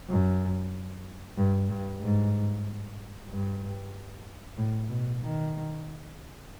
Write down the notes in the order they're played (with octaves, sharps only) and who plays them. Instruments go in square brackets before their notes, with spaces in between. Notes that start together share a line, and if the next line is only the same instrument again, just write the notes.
[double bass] F#2
G2
G2
G#2
G2
A2
B2
D#3